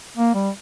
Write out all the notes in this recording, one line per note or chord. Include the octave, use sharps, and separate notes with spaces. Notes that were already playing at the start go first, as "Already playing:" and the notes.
A#3
G3